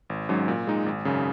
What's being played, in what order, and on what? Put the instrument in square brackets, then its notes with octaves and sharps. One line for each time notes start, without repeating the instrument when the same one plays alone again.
[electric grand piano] G#1
G#2 F#3 C#4
A#2
G#3 D#4
G#1
F#2 C#3